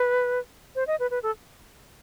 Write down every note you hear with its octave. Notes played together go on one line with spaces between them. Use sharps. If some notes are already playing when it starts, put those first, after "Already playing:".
Already playing: B4
C5
D#5
B4
B4
A4